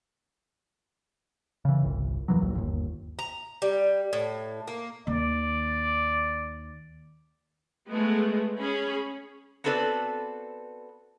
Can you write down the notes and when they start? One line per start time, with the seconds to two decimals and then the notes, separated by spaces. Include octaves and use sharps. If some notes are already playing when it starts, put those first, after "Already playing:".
1.65 C#3 E3
1.83 G1 C2
2.28 D#2 C3 E3 F#3
2.41 A#1 D#2
2.55 G1 D#2
3.19 A#5
3.62 G3
4.13 A2
4.68 A#3
5.07 D#2 D5
7.90 G#3 A3 B3
8.59 C#4 G#4 B5
9.64 B3 C4 F#4 A4 B4 D5